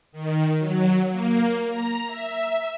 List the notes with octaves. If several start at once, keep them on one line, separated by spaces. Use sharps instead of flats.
D#3
F#3
A#3
A#5
E5